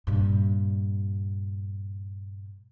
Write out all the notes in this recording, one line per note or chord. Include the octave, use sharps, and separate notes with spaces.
G2 A#2